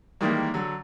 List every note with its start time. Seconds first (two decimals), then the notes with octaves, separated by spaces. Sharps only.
0.21 D#3 E3 G3 G#3 A#3
0.54 D3 F#3